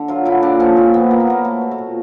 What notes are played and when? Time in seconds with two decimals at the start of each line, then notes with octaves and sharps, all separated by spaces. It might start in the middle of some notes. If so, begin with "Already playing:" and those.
Already playing: D3
0.08 F#3 F4
0.25 D3 E4
0.42 A#2 D4
0.60 F3 C#4
0.76 A#2 C4
0.94 A#2 B3
1.11 B2 A#3
1.20 B3
1.27 F#3 A#3
1.44 B2 A3
1.61 B2
1.71 A3
1.78 A#2